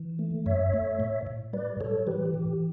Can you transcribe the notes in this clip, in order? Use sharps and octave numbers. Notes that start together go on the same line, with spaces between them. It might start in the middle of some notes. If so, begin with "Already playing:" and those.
Already playing: E3
A3
F#2 C#5 E5
A3
A2
A2
G3 B4 D5
A2 A4 C#5
E3 G4 B4
E3 G4